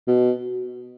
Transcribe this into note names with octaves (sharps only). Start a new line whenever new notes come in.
B2